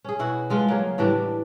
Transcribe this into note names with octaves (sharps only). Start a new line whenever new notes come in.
C#4 G#4
B2 E4 F#4 F#5
F3 G#3 F4 B4
C#3 F#3 A#3
A2 E3 G3 D4